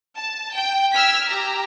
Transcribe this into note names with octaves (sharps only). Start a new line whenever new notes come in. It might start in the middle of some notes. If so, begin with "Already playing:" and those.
A5
G5
E6 F6 G#6 B6
G4 A#5